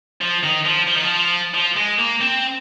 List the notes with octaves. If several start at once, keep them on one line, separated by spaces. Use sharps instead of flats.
F3
D#3
F3
F3
D#3
F3
F3
G#3
A#3
C4